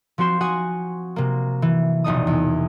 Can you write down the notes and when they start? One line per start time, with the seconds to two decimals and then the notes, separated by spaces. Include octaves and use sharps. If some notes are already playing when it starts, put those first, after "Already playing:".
0.18 F3 C4 F#4 C6 E7
0.41 F#4 F#5 G#5 D#6
1.16 C3 A#3
1.62 E3
2.04 E1 A#1 D#4 D#6
2.27 E2